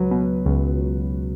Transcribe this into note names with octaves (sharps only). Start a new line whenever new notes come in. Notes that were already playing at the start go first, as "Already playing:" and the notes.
Already playing: C#2 F#3 B4
B2
C#2